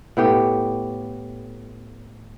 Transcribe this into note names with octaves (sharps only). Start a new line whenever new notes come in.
A2 B3 G4 G5